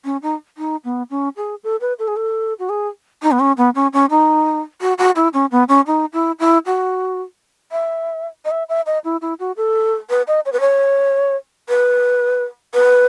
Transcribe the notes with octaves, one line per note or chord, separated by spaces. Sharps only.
C#4
D#4
D#4
B3
C#4
G#4
A4
B4
A4
G#4
A4
F#4
G#4
D#4
B3
C#4
B3
C#4
C#4
D#4
F#4
F#4
E4
C#4
B3
C#4
D#4
E4
E4
F#4
E5
D#5
E5
E5
D#5
E4
E4
F#4
A4
B4
D#5
C#5
B4
C#5
B4
B4